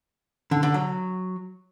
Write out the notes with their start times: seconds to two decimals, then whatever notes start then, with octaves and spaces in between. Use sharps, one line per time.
0.51 D3
0.63 D3
0.74 F#3